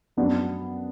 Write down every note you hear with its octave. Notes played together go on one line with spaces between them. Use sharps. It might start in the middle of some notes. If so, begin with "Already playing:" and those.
F#2 F#3 B3 D4